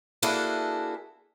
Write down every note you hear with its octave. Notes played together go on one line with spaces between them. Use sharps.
A#3 D4 E4 F#4 G#4 A4